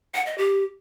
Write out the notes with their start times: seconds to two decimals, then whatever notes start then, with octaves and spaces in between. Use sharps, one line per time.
0.14 F#5
0.26 D#5
0.38 G4